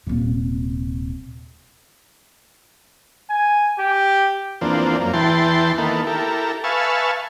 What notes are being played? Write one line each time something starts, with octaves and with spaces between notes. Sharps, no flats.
D#1 C3
G#5
G4
E2 F3 A#3 C4 D4
F#2 A#3
E2 E3 G5 A5 C6
D#3 E3 A#3 B3 A4
E4 G4 A4 A#4
B4 E5 F5 G#5 A5 C#6